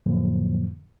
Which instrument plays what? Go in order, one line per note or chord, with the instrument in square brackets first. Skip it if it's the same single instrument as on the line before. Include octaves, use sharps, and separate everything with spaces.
[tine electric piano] F2 A2 D3 F3 F#3 A#3